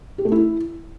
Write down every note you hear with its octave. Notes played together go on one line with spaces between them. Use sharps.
G4
A3
E4